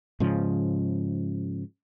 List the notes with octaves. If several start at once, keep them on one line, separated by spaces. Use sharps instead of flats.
G#2 C#3 F3